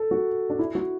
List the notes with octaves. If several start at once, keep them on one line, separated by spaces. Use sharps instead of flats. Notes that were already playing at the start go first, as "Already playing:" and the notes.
Already playing: A4
F#4
D4
E4
F#4